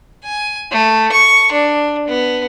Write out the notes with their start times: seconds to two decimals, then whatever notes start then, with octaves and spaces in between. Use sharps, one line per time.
0.24 G#5
0.72 A3
1.12 C#6
1.52 D4
2.07 B3